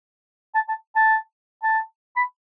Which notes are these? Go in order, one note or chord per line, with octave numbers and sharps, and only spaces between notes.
A5
A5
A5
A5
B5